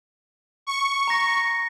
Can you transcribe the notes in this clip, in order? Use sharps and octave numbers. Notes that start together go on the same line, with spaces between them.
C#6
A#5 A#6